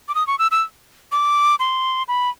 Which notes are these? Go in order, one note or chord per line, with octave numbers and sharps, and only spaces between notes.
D6
D#6
C#6
E6
E6
D6
C6
B5